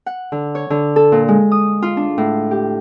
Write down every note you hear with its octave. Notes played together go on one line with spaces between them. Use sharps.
F#5
D3
C#5
D3
A4
A#2
G#3
D#6
F4
D4
A2
G4